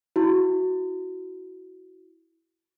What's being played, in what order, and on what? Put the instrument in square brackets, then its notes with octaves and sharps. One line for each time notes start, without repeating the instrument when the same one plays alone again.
[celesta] E4 F#4